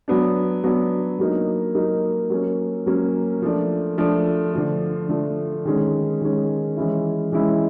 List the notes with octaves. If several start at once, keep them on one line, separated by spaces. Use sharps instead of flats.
F#3 B3 D4
F#3 B3 D4
F#3 A#3 D#4
F#3 A#3 D#4
F#3 A#3 C#4
F#3 A#3 C#4
F3 A3 D4
F3 A3 D4
D3 F3 A3
D3 F3 A3
D#3 G#3 C#4
D#3 G#3 C#4
E3 G#3 C#4 E4
E3 G#3 C#4 E4